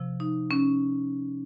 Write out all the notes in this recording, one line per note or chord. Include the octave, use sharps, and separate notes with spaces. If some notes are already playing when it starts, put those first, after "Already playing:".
Already playing: C3 F3
D#4
C#4